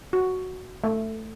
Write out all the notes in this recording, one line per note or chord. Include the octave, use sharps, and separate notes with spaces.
F#4
A3